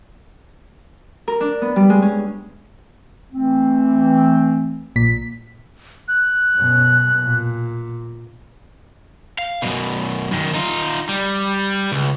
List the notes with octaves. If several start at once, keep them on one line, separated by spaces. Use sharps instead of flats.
A#4
D4
B3
G3
G#3
C#4
E3 A3 C4
A#1 A#2 B6
F#6
F#2 B2
A#2
F5
F#2 B2
F#2 D#3
D#4 F4
G3
C#2